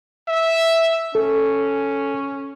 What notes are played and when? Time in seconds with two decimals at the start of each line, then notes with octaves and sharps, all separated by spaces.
0.28 E5
1.15 C#4 A4